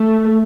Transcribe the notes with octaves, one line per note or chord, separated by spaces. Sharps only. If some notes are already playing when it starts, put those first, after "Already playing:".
Already playing: A3